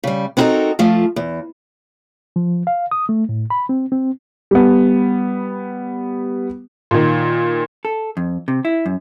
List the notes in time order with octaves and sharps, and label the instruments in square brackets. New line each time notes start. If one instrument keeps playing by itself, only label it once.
[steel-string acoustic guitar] C#3 G3
B3 C4 D#4 F#4 A4 A#4
F3 A3 F4
E2
[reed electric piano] F3
F5
D#6
A3
A2
B5
C4
C4
[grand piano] G3 B3
[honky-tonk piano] A#2 D#3
[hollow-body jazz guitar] A4
F2
C3
E4
F#2